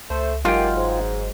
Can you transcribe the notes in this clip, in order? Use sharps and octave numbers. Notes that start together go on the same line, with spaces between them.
C#2 A3 C5
G1 D#3 F#3 G#3 A#3 F4 G4 G5
G#2